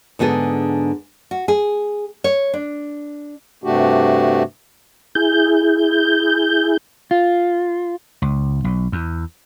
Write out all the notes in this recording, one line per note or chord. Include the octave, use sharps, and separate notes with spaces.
G#2 D3 B3 G#4 A4
F#4
G#4
C#5
D4
G2 C3 A3 D4 F#4 G4
E4 G#4 G6
F4
C#2
B1
E2